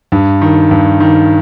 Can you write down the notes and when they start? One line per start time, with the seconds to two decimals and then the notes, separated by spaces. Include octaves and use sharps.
0.12 G2
0.41 D#3
0.71 G2
1.00 D#3